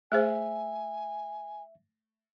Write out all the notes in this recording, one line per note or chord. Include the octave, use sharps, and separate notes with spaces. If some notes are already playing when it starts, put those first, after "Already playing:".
A3 G#4 C5 E5 G#5